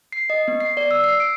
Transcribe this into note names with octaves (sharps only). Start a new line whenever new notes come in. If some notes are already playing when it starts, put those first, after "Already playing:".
C7
D#5
B3
C7
D5
E6
C7
D7